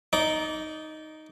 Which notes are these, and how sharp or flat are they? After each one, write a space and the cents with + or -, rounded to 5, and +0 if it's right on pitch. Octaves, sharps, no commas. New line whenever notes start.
D#4 +0 D5 -20